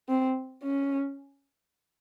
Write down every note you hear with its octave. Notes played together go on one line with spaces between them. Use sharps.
C4
C#4